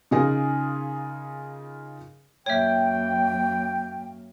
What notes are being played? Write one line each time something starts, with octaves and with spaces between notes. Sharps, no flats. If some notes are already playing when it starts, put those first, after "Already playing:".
C#3 D#4 F4 G#4 A#4
F#2 A#3 C#5 E5 G5